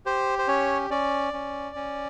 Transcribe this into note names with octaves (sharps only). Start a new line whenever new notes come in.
G4 C5
C5
C#4 C#5
C#4 D5
C#4
C#4